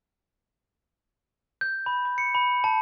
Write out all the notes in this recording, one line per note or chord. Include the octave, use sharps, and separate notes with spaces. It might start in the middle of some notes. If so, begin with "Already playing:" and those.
G6
B5
B5
C#7
B5
A5